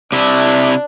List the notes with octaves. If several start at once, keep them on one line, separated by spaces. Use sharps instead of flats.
C3 D4 E4